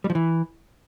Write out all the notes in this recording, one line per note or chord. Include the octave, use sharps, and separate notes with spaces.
G3
F3
E3